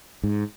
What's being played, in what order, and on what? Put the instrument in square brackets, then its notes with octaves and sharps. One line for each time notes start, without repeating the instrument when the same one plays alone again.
[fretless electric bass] G#2